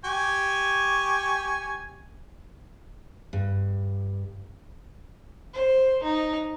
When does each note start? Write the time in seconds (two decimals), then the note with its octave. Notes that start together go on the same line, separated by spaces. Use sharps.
0.05 G4 G#5 C#6
3.33 G2
5.54 C5
6.03 D#4